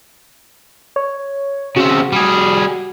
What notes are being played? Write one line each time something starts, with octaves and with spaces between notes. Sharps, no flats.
C#5
C#3 C4 F#4
G3 G#4